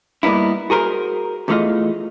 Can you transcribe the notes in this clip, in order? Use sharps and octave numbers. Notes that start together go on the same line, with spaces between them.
G3 A#3 B3 D#4 E4
F#4 G#4 A#4 C5
E2 E3 A3 D#4 F4 D#5